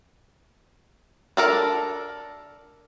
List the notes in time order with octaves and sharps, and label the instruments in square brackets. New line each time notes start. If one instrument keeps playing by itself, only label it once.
[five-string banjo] D4 A4 A#4